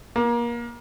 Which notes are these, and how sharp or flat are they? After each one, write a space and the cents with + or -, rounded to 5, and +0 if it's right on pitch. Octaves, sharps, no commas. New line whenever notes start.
A#3 +25